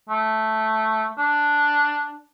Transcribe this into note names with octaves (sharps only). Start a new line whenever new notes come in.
A3
D4